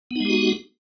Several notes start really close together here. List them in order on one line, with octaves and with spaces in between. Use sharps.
B3 D#4 G#3 G4 F#4